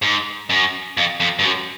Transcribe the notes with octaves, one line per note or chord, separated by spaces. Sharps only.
G#2
F#2
F2
F2
G2
F#2